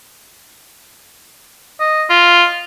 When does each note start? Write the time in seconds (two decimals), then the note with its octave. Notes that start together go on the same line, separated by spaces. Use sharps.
1.80 D#5
2.09 F4